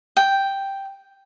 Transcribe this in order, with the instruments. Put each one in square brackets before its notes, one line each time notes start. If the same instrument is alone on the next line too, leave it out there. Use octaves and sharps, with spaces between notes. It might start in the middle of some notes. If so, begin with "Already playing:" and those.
[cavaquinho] G5